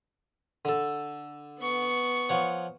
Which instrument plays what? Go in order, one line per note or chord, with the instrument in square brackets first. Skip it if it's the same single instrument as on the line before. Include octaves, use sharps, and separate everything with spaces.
[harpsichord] D3 A4
[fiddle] B3 C#6
[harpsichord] F3 C#5 F#5